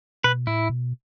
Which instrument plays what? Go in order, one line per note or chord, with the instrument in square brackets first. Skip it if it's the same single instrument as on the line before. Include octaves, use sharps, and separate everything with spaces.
[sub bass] B2 [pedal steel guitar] B4
[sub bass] A2 [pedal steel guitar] E4
[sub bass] B2